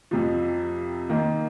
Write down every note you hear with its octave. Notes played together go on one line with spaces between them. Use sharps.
F2 C3 F3
D#3 A#3 D#4